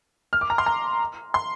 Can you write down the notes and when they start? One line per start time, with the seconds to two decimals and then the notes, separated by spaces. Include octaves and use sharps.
0.33 F6
0.41 D6
0.50 A#5
0.58 C6
0.66 A#5
1.34 C6